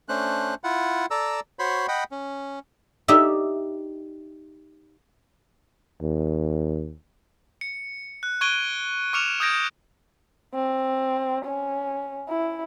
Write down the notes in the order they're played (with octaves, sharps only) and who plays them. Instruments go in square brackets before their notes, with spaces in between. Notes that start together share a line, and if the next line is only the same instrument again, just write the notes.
[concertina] A3 C#4 D4 C5 F#6
E4 F4 F#5
A4 D5 A#5 E6
F#4 C5 C#5 B5 C6
D#5 F#5 G5 B5
C#4
[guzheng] D#4 G4 D5 E5
[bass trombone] D#2
[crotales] C#7
F#6
C#6 F#6 G#6 D7 D#7 G7
C#6 D6 F6 C#7 E7 F7
D#6 F6 G6 G#6 A#6 D7
[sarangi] C4
C#4
E4